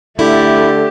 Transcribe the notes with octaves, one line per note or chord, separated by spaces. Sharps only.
D3 A3 E4 G4